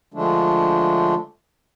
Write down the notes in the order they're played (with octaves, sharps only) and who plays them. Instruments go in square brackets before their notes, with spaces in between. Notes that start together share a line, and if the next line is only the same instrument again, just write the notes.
[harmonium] D3 F3 G#3 A3 D4